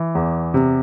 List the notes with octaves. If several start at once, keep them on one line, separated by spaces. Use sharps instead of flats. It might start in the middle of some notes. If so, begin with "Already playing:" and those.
Already playing: E3
E2
C3